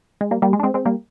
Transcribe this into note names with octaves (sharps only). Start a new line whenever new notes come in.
G#3
G3 A#3
G3 A#3
G#3
D4
G#3 C4
G#3 C4
G3 A#3